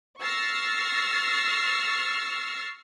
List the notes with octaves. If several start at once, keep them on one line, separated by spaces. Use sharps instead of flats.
C#6 E6 F6 A6 A#6 C7